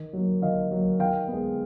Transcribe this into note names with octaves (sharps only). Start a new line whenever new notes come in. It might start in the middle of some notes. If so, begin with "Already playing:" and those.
Already playing: D#3
F#3 A#3
D#3 D#5 F5
F#3 A#3
D#3 F5 G5
G#3 B3